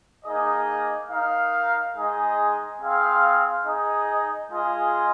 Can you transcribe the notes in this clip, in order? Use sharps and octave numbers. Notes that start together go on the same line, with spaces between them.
A#3 D#4 G#4 D#5
D#4 A#4 F5
G#3 D#4 G#4 D#5
C4 G#4 F5
D#4 G#4 D#5
G#3 F4 G#4 D#5